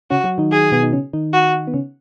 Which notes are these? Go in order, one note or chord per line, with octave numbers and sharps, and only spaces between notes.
C#3 C#4 F#4
F#3 F#4
D#3 D#4
G#4
B2 B3
D#4
C#3 C#4
D#3 D#4
F#4
B3
C#3 C#4